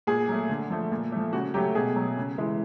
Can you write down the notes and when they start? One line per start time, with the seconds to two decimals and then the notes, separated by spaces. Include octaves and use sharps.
0.07 A#2 G#4
0.28 F#3 A3
0.49 D3
0.70 F3 A3
0.91 A#2
1.12 F3 A3
1.33 C#3 F#4
1.54 F#3 A3 G4
1.75 B2 G#4
1.96 F#3 A3
2.17 C#3
2.38 E3 G#3